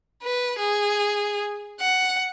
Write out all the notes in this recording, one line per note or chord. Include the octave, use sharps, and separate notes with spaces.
B4
G#4
F#5